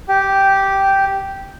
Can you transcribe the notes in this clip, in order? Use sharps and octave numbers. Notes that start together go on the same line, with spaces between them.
G4